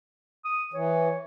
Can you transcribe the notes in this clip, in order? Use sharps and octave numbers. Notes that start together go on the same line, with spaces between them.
D#6
E3 C#5